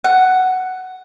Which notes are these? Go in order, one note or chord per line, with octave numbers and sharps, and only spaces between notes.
F#5